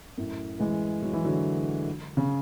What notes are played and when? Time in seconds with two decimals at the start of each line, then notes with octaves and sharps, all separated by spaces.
0.18 F#2 A2
0.59 E3 G#3
1.02 F#3
1.13 E3
1.25 D3 F#3
2.17 C#3